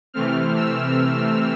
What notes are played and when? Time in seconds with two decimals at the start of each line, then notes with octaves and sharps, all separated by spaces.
0.14 C3 E3 A3 C4 F6
0.56 E6